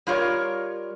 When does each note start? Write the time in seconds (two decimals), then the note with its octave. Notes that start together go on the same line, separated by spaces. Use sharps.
0.07 G3 F4 A#4 C#5